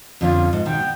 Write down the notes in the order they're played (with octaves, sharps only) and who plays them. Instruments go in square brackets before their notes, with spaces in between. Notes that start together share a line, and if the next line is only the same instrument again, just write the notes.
[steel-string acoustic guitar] F2 D3 C#4 [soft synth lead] F4
[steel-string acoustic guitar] G#2
[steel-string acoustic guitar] B2 D#3 [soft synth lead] G5
[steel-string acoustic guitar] B3